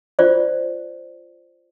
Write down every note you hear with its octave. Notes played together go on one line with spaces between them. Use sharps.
F4 C5 D5